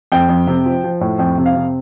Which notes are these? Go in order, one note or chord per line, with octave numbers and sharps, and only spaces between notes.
F2 G5
F2
C3
F3
F3
A2
F2 G5
C3
F5
C3